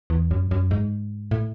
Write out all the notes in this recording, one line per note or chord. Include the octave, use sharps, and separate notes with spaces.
E2
F#2
F#2
G#2
A2